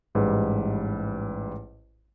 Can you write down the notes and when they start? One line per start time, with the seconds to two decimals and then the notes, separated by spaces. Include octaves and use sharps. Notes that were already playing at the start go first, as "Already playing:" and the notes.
0.15 A1 G#2 G3 B4